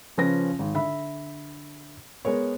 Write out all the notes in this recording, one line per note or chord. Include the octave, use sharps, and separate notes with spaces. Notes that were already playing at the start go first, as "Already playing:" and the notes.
C#3 F3 C#4 B4 A#6
G#1
D3 E5 B5
G#3 B3 A#4 C#5